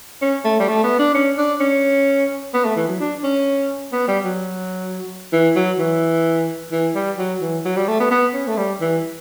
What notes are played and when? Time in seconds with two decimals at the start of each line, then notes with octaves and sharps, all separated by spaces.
0.22 C#4
0.45 A3
0.60 G3
0.68 A3
0.84 B3
0.99 D4
1.15 C#4
1.38 D4
1.60 C#4
2.54 B3
2.65 A3
2.76 E3
2.88 F#3
3.00 D4
3.24 C#4
3.93 B3
4.08 G3
4.24 F#3
5.33 E3
5.56 F#3
5.79 E3
6.72 E3
6.95 G3
7.18 F#3
7.41 E3
7.65 F#3
7.77 G3
7.88 A3
8.00 B3
8.11 B3
8.34 C#4
8.47 A3
8.57 G3
8.81 E3